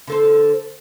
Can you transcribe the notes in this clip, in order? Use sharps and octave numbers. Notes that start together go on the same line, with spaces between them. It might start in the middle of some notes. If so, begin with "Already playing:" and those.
D3 A4 C5